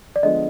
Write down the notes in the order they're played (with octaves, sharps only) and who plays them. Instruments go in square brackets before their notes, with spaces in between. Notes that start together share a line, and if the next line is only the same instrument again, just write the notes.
[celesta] D5
[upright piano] D3 F3 G#3 B3 [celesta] D#5